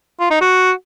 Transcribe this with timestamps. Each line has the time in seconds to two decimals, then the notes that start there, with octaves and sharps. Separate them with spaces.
0.20 F4
0.31 D#4
0.41 F#4